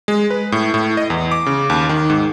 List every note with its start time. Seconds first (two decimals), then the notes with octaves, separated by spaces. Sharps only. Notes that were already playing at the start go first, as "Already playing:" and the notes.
0.08 G#3
0.30 B4
0.52 A2
0.74 A2
0.97 D#5
1.10 E2
1.31 D6
1.46 C#3
1.70 D#2
1.89 D#3
2.10 G#2